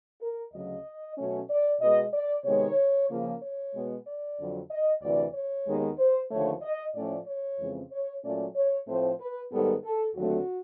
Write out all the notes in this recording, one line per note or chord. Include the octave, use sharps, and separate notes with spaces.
A#4
D2 C#3 F#3 D#5
B2 F#3 A3 C#4
D5
B2 G#3 B3 D#5
D5
C3 D#3 G#3 B3 C#5
C#3 F3 A#3
C#5
B2 G#3 B3
D5
F2 D3 F#3
D#5
D2 C3 E3 D5
C#5
D#2 D#3 G#3 B3
C5
D#2 D3 F3 A3 C#5
D#5
A2 F3 A3 C#4 D5
C#5
F2 C#3 E3 G#3 C4
C#5
A#2 F#3 A3 C#4 D5
C#5
A2 F3 A3 C4 C5
B4
G#2 D#3 G3 B3 A4
A4
D#2 D3 F#3 A3 C4 F#4